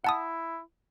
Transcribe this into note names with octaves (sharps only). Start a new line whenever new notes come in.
E4 F#5 A5 D#6